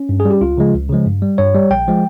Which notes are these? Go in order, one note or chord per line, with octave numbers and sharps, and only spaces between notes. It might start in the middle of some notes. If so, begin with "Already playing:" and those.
Already playing: C#4
G2
G#4
G3
G4
C#2 F4
C#3 F3 G#3
C#2
C#3 F3 G#3
G2
G3
G2 C#5
G3
A#1 G5
F3 G#3